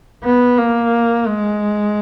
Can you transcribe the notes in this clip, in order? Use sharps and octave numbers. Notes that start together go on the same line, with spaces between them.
B3
A#3
G#3